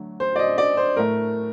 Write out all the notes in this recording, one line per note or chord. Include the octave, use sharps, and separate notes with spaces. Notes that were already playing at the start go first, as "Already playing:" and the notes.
Already playing: D3 F#3 A3
C5
D5
D#5
D5
C5
A2 A3 A#4